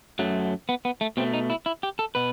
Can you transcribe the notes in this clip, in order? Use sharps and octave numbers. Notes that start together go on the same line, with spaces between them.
F#2 F#3 A3
B3
B3
A3
B2 A3 C4
D#4
E4
E4
G4
A4
B2 B4